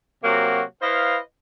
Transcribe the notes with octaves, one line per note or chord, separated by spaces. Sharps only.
C3 F#3 A#3 F#4
E4 B4 C5 D#5 F5